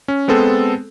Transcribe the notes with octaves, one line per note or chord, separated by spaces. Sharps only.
C#4
G#3 B3 C4 A4